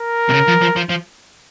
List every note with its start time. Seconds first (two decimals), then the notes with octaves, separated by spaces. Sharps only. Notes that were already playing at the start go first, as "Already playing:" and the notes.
Already playing: A#4
0.30 C3
0.33 C#3
0.48 F3
0.62 F3
0.76 F3
0.90 F3